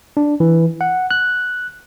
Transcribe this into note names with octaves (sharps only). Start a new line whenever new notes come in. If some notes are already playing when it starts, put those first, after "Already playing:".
D4
E3
F#5
F#6